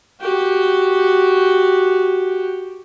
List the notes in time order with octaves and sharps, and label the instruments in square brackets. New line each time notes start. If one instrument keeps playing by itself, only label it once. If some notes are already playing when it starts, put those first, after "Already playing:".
[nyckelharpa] F#4 G4